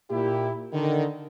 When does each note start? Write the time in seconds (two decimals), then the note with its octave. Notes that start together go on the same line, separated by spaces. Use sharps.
0.11 A#2 E4 G4
0.73 D3 D#3